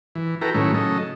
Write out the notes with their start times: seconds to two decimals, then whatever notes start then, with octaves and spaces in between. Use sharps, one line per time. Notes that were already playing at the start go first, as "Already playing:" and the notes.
0.15 E3
0.41 E4 F#4 A4 B4 G5 A#5
0.54 A2 D#3 F#3 A3 C#4 E4
0.74 C#3 F#3 A4 D#5